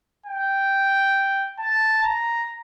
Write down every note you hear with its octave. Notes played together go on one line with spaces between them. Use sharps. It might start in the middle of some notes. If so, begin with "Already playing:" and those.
G5
A5
A#5